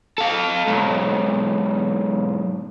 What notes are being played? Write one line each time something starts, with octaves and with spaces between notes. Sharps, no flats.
A4 F5
B1 G#2